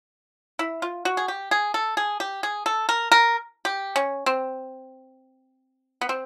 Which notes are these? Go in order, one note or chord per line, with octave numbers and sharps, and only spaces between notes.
E4
F4
F#4
G#4
G4
G#4
A4
G#4
G4
G#4
A4
A#4
A#4
G4
C#4
C4
B3
C4